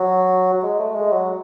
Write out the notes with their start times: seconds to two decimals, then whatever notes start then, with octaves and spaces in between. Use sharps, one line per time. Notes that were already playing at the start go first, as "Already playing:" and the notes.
Already playing: F#3
0.53 F#3
0.63 G#3
0.79 A3
0.95 G#3
1.12 F#3